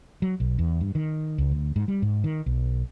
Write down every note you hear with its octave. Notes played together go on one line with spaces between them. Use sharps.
F#3
B1
E2
G2
D#3
C#2
D2
G#2
G3
G#2
D#3
B1